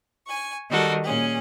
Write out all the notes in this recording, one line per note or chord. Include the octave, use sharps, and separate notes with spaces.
G#5 C#6
D#3 G3 F#4 A4 A#4
A#2 C#4 G#4